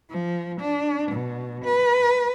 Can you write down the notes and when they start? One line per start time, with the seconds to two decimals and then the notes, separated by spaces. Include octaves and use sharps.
0.11 F3
0.60 D4
1.11 B2
1.65 B4